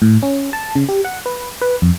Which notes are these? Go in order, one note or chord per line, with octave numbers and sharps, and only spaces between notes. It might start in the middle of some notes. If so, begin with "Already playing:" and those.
A2
C#4
A5
C#3
G4
F#5
B4
B4
F2